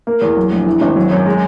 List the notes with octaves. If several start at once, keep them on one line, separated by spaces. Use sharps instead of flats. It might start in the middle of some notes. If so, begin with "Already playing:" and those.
A#3
E2
F#3
A#1
E3
G#1
F#3
F#2
G#3